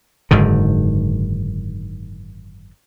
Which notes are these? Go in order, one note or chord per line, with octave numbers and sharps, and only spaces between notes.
F#1 G#2 D3 D#3